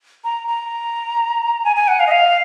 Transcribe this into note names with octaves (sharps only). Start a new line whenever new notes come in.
A#5
A#5
G#5
G#5
F#5
F5
D#5
F5